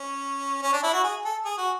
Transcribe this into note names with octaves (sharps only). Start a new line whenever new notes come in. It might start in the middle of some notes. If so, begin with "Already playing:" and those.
Already playing: C#4
C#4
D4
E4
F#4
G#4
A4
G#4
F#4